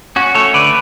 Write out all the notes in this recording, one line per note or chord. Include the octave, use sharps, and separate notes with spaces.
C#4 F#4
A3 A4 C#5
D3 B4 D5